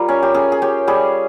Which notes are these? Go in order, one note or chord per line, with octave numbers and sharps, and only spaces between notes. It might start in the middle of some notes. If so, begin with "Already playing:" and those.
Already playing: G3 F4 A#4
C#4
G4
C#4 G#4
G#4
C#4 G4
G3 G#4